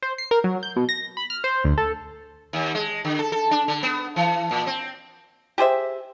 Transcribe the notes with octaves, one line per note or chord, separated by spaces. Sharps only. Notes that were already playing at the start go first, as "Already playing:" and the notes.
C5
C7
A#4
F#3
G6
B2
A#6
B5
F6
C5
D2
A4
D#2
G#3
D3
A4
A4
D4
D3
B3
E3
A#2
C4
G4 G#4 C5 E5